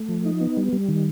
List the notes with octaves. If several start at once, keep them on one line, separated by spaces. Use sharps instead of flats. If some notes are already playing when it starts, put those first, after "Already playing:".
Already playing: A3
F3
D#4
B3
G3
G3
D#3